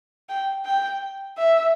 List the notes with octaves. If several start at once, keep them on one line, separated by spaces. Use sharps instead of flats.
G5
G5
E5